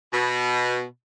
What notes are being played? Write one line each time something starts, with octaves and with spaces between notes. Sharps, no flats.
B2